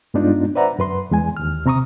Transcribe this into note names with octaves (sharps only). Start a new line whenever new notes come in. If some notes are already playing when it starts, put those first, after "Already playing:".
G2 G#3 B3 D4 D#4 F4
B4 C5 D5 E5 F#5 A#5
F#2 B4 C6
E2 G#3 G#5
D#2 F6
C3 C4 A#5 C#6 D#6